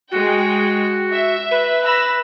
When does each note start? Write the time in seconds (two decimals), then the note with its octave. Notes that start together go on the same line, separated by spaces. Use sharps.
0.11 G#3 F#4 G5
1.12 E5
1.51 B4
1.86 B5 E6 A#6